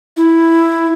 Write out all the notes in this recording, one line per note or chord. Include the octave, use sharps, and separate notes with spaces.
E4